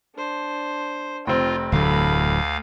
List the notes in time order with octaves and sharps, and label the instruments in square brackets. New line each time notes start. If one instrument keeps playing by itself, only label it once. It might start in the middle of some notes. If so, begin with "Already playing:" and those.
[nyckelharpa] D4 C5
[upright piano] F1 C4 [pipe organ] F4 [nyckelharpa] G5
[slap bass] D1 D3 F#3 [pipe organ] D2 F5 [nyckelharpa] A3 B5